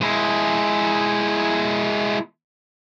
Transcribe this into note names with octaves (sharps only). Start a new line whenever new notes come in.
G#3 E4